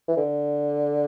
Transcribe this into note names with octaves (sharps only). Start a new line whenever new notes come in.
E3
D3